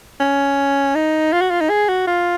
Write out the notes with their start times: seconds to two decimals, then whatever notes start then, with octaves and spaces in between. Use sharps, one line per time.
0.20 C#4
0.95 D#4
1.32 F4
1.41 F#4
1.51 F4
1.61 D#4
1.69 G#4
1.89 F#4
2.07 F4